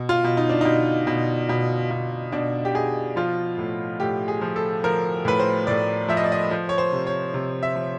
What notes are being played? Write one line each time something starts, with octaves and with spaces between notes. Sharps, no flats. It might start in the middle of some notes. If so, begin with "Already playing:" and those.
Already playing: B2
F4
B2
D#4
D4
B2 D#4
B2
B2
B2
B2 D4
G4
B2 G#4
F3 F4
A2
A2 G4
G#4
F3
A4
F3 A#4
A2 B4
C5
A2 D5
F3 E5
D#5
D5
D#5
F3
C#5
C5
C3
C#5
C3
E5
F3